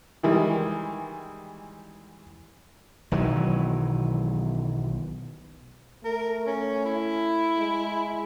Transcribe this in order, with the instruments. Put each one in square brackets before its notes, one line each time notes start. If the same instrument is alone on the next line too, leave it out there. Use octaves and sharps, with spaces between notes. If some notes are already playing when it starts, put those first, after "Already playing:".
[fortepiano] D#3 E3 G3 G#3
[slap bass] B1 D#3 E3 F#3
[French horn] A3 [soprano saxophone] A#4
[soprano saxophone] C#4
E4
[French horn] G#3